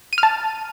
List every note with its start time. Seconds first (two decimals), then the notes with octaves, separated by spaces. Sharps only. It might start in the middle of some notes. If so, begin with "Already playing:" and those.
0.13 D#7
0.18 F6
0.23 A5